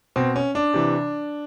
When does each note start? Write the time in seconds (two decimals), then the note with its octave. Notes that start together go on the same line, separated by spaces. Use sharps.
0.16 B2 C4
0.36 C#4
0.55 D4
0.74 C3 E3